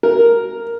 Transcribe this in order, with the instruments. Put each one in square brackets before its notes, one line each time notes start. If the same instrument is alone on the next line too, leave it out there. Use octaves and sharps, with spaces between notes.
[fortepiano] A#4